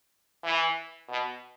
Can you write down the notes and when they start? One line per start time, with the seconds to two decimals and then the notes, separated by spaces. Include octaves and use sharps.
0.44 E3
1.09 B2